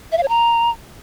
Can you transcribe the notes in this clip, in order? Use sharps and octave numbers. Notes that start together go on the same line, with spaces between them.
E5
F5
C#5
A#5